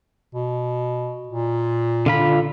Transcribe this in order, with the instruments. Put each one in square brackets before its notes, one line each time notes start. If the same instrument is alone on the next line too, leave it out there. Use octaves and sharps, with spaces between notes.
[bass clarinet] B2
A#2
[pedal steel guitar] D3 F4 B5